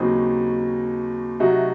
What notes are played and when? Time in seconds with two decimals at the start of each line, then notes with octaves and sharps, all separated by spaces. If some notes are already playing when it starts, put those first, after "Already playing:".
Already playing: D#2 C#3 F#3 C4 D#4
1.40 C3 F#3 A3 D#4 F#4